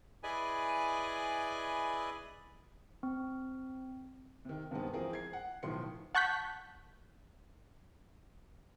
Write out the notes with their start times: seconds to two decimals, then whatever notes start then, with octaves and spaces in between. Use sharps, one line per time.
0.23 E4 G#4 B4 D5 D#5 G#5
3.03 C4
4.45 C3 D#3
4.71 G2 C3 D#3 G#3 B3 C4
4.93 E3 F3 C4 G#4 A#4
5.13 G#6 C7
5.33 F#5
5.63 B1 A2 D#3 F3 C6 C#7
6.15 F#5 A5 C#6 F#6 G6 B6